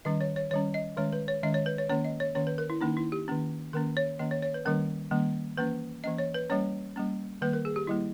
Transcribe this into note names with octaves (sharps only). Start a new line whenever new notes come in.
D#3 G3 C#4 D#5
C#5
C#5
D#3 G3 C#4 C#5
D#5
D#3 G#3 C#4 C#5
B4
C#5
D#3 G#3 C#4 D#5
C#5
B4
C#5
D#3 A#3 C#4 C#5
D#5
C#5
D#3 A#3 C#4 C#5
B4
A#4
E4
D#3 A#3 C#4 D#4
E4
G4
D#3 A#3 C#4
D#3 A#3 C#4 A#4
C#5
D#3 A#3 C#4 D#5
C#5
C#5
B4
D#3 G3 A#3 C#4 A#4
D#3 G3 A#3 C#4
E3 A#3 C#4 B4
E3 A#3 C#4 D#5
C#5
B4
G3 A#3 C#4 C#5
G3 A#3 C#4
D#3 G3 A#3 B4
A#4
G#4
G4
D#3 G3 A#3 E4